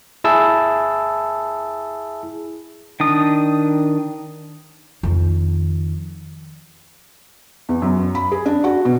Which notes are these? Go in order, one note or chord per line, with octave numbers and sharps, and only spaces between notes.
E4 G#4 A5 E6
D#3 D4 D#6
F2 D#3
E2
F#2
B5
G#4
D4
F#4
B2